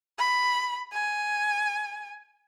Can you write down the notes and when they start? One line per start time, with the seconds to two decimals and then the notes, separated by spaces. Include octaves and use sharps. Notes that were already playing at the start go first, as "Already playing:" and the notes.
0.19 B5
0.93 G#5